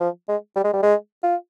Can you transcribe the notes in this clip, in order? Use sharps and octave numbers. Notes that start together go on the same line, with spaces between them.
F3
G#3
G3
G#3
G3
G#3
F4